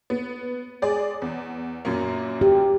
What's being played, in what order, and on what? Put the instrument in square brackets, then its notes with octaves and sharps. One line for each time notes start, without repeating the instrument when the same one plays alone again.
[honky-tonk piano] B3
G#3 G#4 D5
E2
F#2 A#2 A#3
[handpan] G4